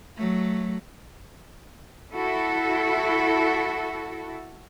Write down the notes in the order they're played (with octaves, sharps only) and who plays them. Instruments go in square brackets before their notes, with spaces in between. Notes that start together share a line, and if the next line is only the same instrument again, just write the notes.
[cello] F#3 A3
[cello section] E4 F#4 A4